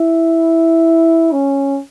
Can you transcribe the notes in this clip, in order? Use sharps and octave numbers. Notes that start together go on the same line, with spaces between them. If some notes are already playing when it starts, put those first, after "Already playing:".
Already playing: E4
C#4